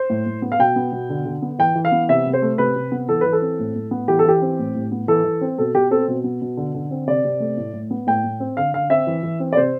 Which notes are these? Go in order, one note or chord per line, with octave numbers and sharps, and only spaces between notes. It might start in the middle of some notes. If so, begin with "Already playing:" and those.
Already playing: C5
A2
A2
B3
F5
B2 G5
B3
B2
D3
D3
B3
E3 G5
E3
F5
B3
C3 E5
C3
C5
A3
C3 B4
C3
B3
E3 A4
E3 B4
A4
C4
A2
A2
B3
E3 G4
A4
E3 G4
C4
A2
A2
B3
E3 A4
E3
C4
B2 A4
B2 G4
C4 A4
B2
B3
B2
D3
D3
C4
C3 D5
C3
A3
A2
A2
B3
A2 G5
A2
C4
D3 F5
D3 F5
C4 E5
E3
E3
C4
D5
C3 C5